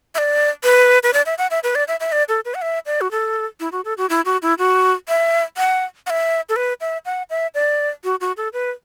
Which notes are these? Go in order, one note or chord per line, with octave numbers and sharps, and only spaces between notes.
E5
D5
B4
B4
D5
E5
F#5
E5
B4
D5
E5
E5
D5
A4
B4
F#5
E5
D5
F#4
A4
E4
F#4
A4
F#4
E4
F#4
E4
F#4
E5
F#5
F#5
E5
A4
B4
E5
F#5
E5
D5
F#4
F#4
A4
B4